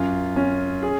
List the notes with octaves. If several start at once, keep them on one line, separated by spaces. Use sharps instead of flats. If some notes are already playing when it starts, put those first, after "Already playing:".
Already playing: F#2 F4
C#4
G#4